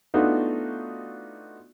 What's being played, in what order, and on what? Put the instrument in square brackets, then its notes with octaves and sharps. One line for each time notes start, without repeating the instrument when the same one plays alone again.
[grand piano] A3 B3 D4 D#4 F4 F#4